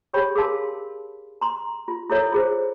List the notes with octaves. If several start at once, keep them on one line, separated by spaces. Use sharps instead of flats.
G4 G#4 C#5 G5 B5
G#4 A#4 F5 A5 C6
A#5 C6
F4
E4 F4 A4 A#4 C#5 E5
F4 G#4 C5